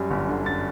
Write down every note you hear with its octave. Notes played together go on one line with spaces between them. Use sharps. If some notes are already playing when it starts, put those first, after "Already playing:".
Already playing: F#2 G3
G1
D3
F#2 A6